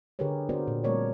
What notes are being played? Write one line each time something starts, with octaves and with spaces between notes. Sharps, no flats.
D3 G4 G#4 A#4 B4 C#5
B3 F#4 A#4 C5 D5
A#2
G3 A3 C4 A#4 C#5 D5